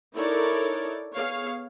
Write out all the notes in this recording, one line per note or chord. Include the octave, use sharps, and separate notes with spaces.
D#4 E4 A4 A#4 C#5 D5
B3 G#4 C#5 F5